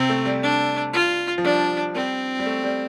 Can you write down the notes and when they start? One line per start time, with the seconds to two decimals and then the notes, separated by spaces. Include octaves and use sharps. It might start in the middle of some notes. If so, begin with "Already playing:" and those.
Already playing: C3 C4
0.09 A3
0.26 G3
0.43 D4
0.94 F4
1.38 F3
1.44 G3 D4
1.95 G3 C4
2.39 G3
2.46 A3
2.64 G3